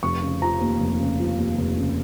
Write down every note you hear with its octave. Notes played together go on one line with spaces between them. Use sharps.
F1 C#6
C#3
F3 A#5
D#2
F1
C#3
F3
D#2
F1
C#3